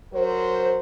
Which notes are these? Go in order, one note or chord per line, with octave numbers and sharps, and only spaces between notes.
F#3 A#4 C5